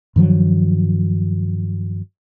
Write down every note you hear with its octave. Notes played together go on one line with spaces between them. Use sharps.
G2 D#3 F3 F#3